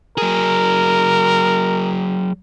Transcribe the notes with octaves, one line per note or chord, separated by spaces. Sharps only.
F#3 G#4 A#4